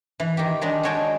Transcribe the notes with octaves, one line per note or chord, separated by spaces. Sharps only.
E3
D#3 G4
D#3 G#3 D4
G#3 F#4 C#5 G5 A5